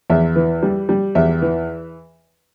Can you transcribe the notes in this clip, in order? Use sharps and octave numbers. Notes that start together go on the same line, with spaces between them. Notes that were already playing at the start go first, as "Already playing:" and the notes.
E2 E5
E3
G3
G3
E2 E5
E3